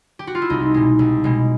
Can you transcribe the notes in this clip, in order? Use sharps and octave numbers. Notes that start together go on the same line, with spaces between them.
G4
F#4
F4
E4
C2 D#4
B2 G#3
C2
B2 G#3